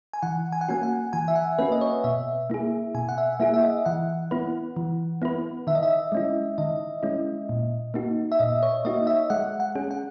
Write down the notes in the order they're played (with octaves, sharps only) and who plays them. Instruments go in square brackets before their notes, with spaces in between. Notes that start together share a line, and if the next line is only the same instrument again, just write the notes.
[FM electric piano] G#5
[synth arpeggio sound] E3 [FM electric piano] F#5
[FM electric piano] G#5
F#5
[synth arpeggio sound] A#3 C#4 F#4 [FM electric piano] G#5
[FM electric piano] F#5
[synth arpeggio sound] E3 [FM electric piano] G#5
[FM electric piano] E5
F#5
[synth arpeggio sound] A#3 C#4 F#4 [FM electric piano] B4
[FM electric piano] D#5
C#5
[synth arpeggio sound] B2 [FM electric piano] E5
[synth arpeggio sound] A#3 E4 G#4
[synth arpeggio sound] B2 [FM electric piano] G#5
[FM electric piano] F#5
E5
[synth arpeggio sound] A#3 E4 G#4 [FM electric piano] E5
[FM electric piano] E5
D#5
[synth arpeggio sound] E3 [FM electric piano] F#5
[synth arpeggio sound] B3 E4 B4
E3
B3 E4 B4
[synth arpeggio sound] D#3 [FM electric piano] E5
[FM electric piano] D#5
E5
[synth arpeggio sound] G#3 C#4 E4
[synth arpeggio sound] D#3 [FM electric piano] D#5
[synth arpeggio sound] G#3 C#4 E4
A#2
A#3 D#4 F#4
[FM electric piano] E5
[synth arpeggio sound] A#2 [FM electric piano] D#5
[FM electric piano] C#5
[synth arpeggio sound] A#3 D#4 F#4 [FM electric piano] D#5
[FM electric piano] E5
[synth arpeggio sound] G#3 [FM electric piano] F#5
[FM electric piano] F#5
[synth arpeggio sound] C#4 G#4
[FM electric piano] F#5